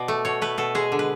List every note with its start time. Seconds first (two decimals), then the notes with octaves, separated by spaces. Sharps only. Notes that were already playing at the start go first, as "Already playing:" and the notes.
Already playing: B2 D5
0.08 A3
0.25 B2 C#5
0.42 A3 B4
0.58 B2 A4
0.75 G#3 G#4
0.92 D3
0.99 B4